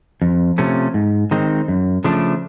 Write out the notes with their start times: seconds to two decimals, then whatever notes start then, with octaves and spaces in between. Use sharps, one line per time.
0.22 F2
0.58 C3 F3 A3 C#4
0.94 G#2
1.31 D#3 G#3 C4 D#4
1.68 F#2
2.04 C#3 F3 A3 D4